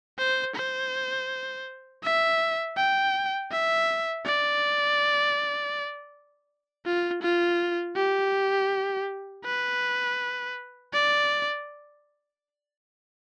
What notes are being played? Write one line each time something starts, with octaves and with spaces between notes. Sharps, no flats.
C5
C5
E5
G5
E5
D5
F4
F4
G4
B4
D5